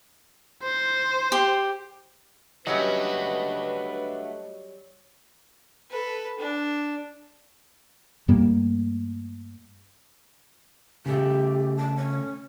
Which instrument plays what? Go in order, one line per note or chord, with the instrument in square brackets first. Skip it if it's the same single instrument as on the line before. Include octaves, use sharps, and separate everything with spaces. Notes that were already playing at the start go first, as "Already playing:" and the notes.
[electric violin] C5
[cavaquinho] G4
[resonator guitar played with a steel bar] F#3 G3 C#4 [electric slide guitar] A3 F#4 [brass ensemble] D4 B4 [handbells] D#5
[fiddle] A4 B4
D4
[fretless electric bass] G2 G3 A3 A#3
[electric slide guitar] C#3 A3 [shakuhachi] G4
[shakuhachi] A5
C#4